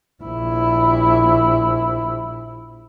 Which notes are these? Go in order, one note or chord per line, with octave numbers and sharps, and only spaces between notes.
A#1 E4